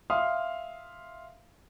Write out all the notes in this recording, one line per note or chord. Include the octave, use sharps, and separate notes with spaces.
E5 F5 C6 D#6 F6